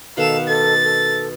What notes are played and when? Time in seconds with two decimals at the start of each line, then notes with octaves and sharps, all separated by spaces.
0.17 B2 D#3 A4 F5 F#5 E7
0.47 A4 A6
0.83 A4